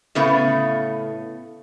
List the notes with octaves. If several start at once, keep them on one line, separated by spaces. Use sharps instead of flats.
A2 C#3 A3 B3